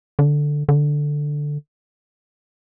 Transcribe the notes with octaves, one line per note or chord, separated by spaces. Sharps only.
D3
D3